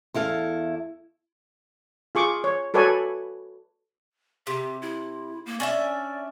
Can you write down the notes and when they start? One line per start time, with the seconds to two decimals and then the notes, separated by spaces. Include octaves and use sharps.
0.14 E2 E4 A4 F5
2.15 F4 G#4 C#6 D6
2.44 C#5
2.74 F#4 A4 B4 C#5 D5 G#5
4.47 C3 G4
4.82 E4
5.46 A#3
5.60 C#4 D4 D5 E5